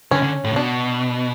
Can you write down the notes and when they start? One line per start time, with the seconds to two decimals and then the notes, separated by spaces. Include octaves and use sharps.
0.11 D3 C#4
0.23 D3
0.44 A2
0.51 C#3
0.56 B2 D4